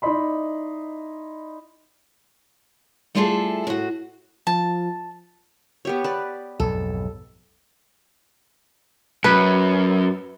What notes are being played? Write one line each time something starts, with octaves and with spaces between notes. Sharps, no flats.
D#4 E4 D5 D#5 B5 C6
G3 A3 E4 F4 G#4 A4
A2 F#4
F3 A5
B3 G4 C#5
B4 D5
B1 F2 G#2 A4
F#2 B4